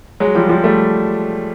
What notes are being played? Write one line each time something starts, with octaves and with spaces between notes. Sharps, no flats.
F#3 G#3
F3 G3
F3 G3
G3 A3